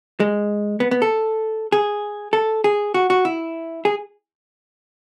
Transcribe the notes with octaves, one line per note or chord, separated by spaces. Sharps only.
G#3
B3
B3
A4
G#4
A4
G#4
F#4
F#4
E4
G#4